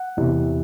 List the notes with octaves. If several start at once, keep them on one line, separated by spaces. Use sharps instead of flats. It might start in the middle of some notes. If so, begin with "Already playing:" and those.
Already playing: F#5
E2 C3 E3